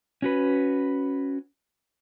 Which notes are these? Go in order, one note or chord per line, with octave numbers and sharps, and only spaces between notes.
C#4 F#4 B4